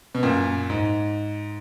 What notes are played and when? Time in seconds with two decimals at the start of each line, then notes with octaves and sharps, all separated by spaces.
0.15 B2
0.23 F#2 A#2
0.70 G#2